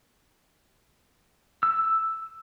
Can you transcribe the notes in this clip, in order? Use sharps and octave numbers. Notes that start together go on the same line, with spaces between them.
E6